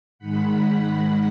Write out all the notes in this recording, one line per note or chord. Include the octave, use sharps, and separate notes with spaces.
G#2 D#3 G#3 F#5 B5